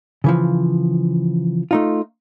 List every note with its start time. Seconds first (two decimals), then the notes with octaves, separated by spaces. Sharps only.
0.24 C#3 E3 F3
1.71 A3 D#4 F4